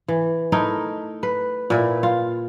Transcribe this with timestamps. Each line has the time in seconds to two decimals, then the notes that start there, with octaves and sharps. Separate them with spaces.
0.08 E3
0.52 A3 D#4 E4 A#4
1.23 B4
1.70 A#2 E4 B4
2.03 F4